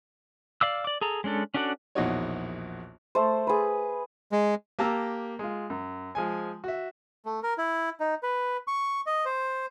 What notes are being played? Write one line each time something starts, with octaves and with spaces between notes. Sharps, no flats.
D5 F5 D6 E6
D5 D6
G#4 A4 A#5
G#3 C#4 D4 A4
C#4 D4 F#4 A4 D5
A#1 E2 B2 D#4 F#4 C#5
A3 A4 C5
G#4 B4
G#3
A#3 G4 A5 A#5 E6
G#3 F4
F#2
F3 G#3 G#5
F#4 E5
A3
A#4
E4
D#4
B4
C#6
D#5
C5